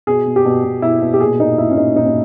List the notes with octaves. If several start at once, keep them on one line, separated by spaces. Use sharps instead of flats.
B2 G#4
B2
G4
B2
B2
B2 E4
B2
G4
A#2 G#4
A#2 D#4
A#2 E4
C#4
A#2 D#4
A#2 D#4
C#4